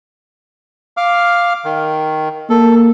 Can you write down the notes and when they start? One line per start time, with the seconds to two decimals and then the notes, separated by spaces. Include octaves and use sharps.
0.97 F5 D6 F6
1.65 D#3
2.50 A#3 A4